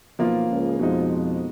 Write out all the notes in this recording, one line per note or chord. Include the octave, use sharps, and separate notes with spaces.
B1 B2 F3 A#3 F4
C#2 C#3
F2 B2 F3 G#3 D#4